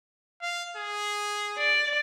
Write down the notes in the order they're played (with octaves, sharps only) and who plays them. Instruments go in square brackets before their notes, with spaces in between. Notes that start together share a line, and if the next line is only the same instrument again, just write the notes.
[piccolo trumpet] F5
G#4
[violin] D5